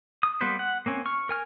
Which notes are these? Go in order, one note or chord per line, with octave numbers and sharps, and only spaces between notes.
D#6
G3 A#3 B3 B4 C5
F#5
A#3 C4 C#4
C#6 F6
A#4 G#5 F6